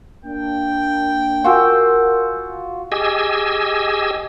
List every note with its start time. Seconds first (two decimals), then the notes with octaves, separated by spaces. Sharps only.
0.25 A#3 D4 G5
1.44 F4 F#4 A#4 G#5 E6 G6
2.92 G4 G#4 D#5 G#5 E6